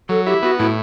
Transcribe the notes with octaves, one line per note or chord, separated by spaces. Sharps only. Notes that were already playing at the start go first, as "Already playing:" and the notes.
F#3 A4
E4 G4
B3 F#4
A2 E4